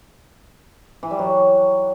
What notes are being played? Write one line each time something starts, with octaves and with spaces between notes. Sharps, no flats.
E3
G3
F#3